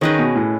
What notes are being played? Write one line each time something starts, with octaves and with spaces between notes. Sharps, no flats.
D#3 C#4 G#4 B4 D#5
B2
A2